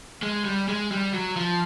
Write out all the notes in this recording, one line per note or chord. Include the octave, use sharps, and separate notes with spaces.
G#3
G3
G#3
G3
F#3
F3